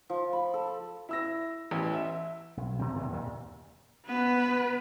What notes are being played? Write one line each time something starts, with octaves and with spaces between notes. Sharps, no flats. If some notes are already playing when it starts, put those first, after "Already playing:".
F3
B5
A4
E4 E6 A#6
A1 E3
E5
B1
D#2 C3 C4
F#2 A#2 D#3 E3
D#2 A#2
B3 B4